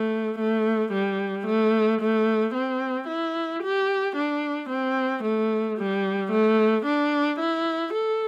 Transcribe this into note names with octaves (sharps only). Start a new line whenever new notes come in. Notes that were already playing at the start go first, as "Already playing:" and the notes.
Already playing: A3
A3
G3
A3
A3
C4
E4
G4
D4
C4
A3
G3
A3
D4
E4
A4